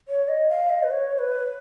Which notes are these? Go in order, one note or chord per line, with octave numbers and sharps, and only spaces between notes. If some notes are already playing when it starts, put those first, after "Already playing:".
C#5
D#5
F5
D#5
B4
C#5
B4